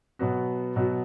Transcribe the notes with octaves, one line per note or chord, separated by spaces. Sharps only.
B2 F#3 B3 F#4
B2 F#3 B3 F#4